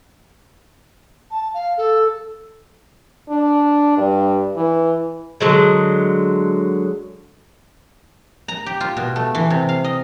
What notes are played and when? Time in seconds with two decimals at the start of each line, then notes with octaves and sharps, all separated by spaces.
1.31 A5
1.54 F5
1.77 A4
3.29 D4
3.97 G2
4.56 E3
5.40 D3 F#3 G#3
8.48 A#5
8.66 G4
8.80 F4
8.97 B2
9.16 A3
9.35 E3
9.50 C3
9.69 F5
9.84 D#5